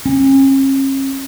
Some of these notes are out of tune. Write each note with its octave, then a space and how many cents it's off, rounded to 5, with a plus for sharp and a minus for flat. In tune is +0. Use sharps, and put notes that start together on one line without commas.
C#4 -40